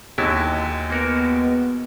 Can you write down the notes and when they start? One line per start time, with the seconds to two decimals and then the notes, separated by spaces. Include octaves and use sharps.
0.18 D#2 D3 F#3 G#3 E4
0.90 A#3 B3 F#4 A#4